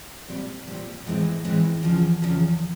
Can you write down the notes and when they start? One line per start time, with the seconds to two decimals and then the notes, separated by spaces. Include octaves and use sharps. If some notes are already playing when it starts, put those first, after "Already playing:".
0.28 A#2 G3 C4
0.67 A#2 G3 C4
1.06 A2 E3 G#3 C4
1.45 A2 E3 G#3 C4
1.83 E2 C#3 F3
2.22 E2 C#3 F3